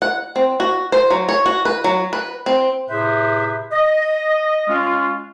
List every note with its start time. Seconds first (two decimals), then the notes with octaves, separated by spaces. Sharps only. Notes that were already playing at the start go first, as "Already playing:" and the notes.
0.02 F#5
0.36 C4
0.60 F#4
0.92 C5
1.11 F#3
1.29 C#5
1.46 F#4
1.65 B4
1.84 F#3
2.13 B4
2.46 C4
2.89 A2 C3 G#4 B4 C5 E5
3.72 D#5
4.68 G#3 C#4 F4